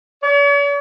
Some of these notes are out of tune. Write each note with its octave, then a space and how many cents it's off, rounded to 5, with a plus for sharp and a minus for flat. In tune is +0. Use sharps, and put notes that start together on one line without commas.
C#5 +45